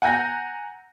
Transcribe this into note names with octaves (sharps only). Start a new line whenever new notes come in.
F#5 G#5 A#5 G6 A#6